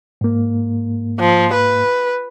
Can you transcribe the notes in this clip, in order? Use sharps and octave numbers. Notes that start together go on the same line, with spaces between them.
G#2 A#3
F3
B4